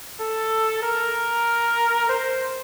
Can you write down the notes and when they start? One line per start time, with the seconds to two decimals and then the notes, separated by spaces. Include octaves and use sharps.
0.20 A4
0.83 A#4
2.09 C5